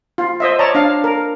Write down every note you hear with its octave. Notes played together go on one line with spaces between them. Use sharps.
F4
C5 D#5 E5
C#5 D5 A5 A#5
D4 F5
A#4